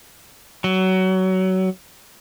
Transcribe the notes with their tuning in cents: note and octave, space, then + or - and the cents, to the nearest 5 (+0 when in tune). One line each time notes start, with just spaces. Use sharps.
F#3 +20